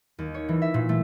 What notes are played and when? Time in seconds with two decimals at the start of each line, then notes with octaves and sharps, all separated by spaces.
0.19 D#2
0.34 C#5
0.49 E3
0.62 E5
0.74 A#2
0.89 A3